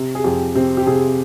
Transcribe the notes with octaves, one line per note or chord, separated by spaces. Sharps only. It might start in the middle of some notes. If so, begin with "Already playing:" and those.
Already playing: C3
G#4
F2 G4
C3 C4
G4
C3 G#4